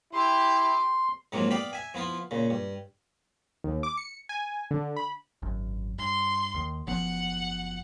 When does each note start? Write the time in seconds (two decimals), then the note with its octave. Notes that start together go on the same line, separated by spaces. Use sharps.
0.13 E4 G4 G5 C6
1.32 G#2 C3 F3 F#3 A#3
1.51 B3 D5 F5 G5 B5
1.73 E5 G#5
1.94 F3 B3 E4 F4
2.31 A#2 C#3
2.50 G2
3.64 D#2
3.83 D6
3.97 C#7
4.29 G#5
4.71 D3
4.96 B5
5.42 G#1 F#2
5.98 G2 C6
6.54 D#2 D#3
6.87 F#1 F3 B3 F#5